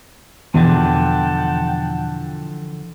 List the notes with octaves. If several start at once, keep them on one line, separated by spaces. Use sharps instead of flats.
E2 B2 D3 E3 F3 F#5 G5 A5